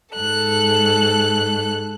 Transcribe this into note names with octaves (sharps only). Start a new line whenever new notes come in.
G#2 A4 F#6